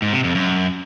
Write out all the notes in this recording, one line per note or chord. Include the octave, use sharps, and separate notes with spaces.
G#2
C3
F2
F#2